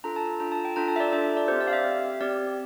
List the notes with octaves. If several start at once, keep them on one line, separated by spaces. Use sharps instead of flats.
D4 F4 A4 A#5
A5
A5
D4 F4 A4 A#5
A5
G5
D4 F4 A4 A#5
A5
E5
D5
D4 F4 A4 E5
D5
C4 G4 C5
D5
F5
E5
C4 G4
C4 G4 D5